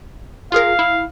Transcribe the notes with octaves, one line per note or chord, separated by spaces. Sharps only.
F4 G#4 A#4 F5
E4